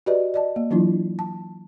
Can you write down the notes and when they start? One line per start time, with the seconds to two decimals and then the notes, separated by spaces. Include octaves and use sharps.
0.06 F#4 G4 B4 D5 D#5
0.34 D5 D#5 A5
0.56 A#3
0.71 E3 F#3 D4 E4 F4
1.19 A5